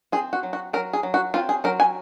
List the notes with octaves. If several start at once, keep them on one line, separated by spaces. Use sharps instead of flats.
C4 G#4
F#4
F#3
F#4
F#3 A#4
G#4
F#3
F#4
C4 F4
G#4
F#3 A#4
G#5